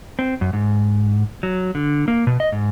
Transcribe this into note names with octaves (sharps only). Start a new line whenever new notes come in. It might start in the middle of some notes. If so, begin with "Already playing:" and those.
C4
F#2
G#2
F#3
D3
A#3
B2
D#5
G#2